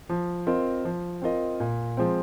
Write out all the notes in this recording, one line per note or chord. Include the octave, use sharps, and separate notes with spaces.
F3
C4 F4 A#4 D#5
F3
C4 F4 A#4 D#5
A#2
F3 G#3 C4